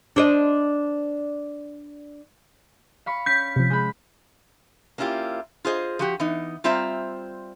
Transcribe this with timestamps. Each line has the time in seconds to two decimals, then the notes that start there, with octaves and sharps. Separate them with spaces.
0.16 D4 C5 D#5
3.06 F5 B5 C#6
3.26 C#4 G6 B6
3.56 C3 F3
3.70 G#3 B5
4.98 A#3 C#4 E4 F4 G4
5.65 F4 G#4 C5 D#5
5.99 F3 F#4 G4
6.20 E3 B3 D#4
6.64 G3 C4 F4 C5 E5 A#5